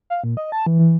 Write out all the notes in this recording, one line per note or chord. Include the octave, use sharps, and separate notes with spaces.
F5
A#2
D#5
A5
E3
E3